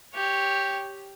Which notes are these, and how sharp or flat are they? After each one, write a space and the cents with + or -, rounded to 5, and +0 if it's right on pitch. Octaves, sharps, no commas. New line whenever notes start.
G4 +0 C#5 +0